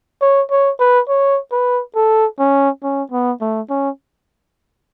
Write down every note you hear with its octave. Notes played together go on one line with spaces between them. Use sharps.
C#5
C#5
B4
C#5
B4
A4
C#4
C#4
B3
A3
C#4